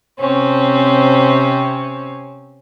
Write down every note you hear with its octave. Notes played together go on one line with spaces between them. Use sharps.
C3 C4 C#4